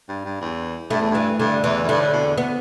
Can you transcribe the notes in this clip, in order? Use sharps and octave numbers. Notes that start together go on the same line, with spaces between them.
G2
G2
E2
G2 A3
E2
G2 E3
G2 D3
E2 E3
E2
G2 D3
A2
B2
E2
B3